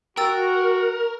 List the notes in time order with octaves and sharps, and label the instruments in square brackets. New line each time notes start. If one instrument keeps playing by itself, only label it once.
[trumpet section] F#4 [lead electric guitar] A#4 [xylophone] G5 E6 A6